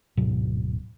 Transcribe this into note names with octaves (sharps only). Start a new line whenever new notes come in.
D1 G#2 B2 F#3